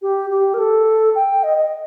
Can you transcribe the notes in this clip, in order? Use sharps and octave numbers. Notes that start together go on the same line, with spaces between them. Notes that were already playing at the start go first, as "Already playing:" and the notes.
G4
G4
A#4
A4
G5
D#5
D#5